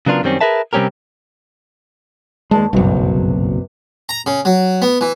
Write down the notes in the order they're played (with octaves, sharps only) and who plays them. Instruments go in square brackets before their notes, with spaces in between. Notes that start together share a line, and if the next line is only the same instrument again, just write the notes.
[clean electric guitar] C#3 F#3 B3 D4 F4 A#4
F#2 D#3 G3 A#3 C4 C#4
G#4 A#4 B4 E5 A5
C3 G3 C4 C#4 G4 A#4
[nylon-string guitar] D#2 D5 A5 [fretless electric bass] G#3
[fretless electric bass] F#1 B1 [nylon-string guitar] G2 C3 F#3
[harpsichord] A#5
C#3
F#3
B3
E3